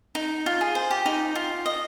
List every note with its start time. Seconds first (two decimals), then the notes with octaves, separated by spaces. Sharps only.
0.15 D#4
0.46 F4
0.61 G#4
0.75 C5
0.91 G4
1.06 D#4
1.35 F4
1.66 D#5